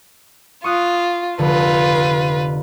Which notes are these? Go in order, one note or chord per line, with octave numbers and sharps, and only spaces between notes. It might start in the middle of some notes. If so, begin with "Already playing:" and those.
F4 C#6 D#6 F#6
F1 D3 F4 B4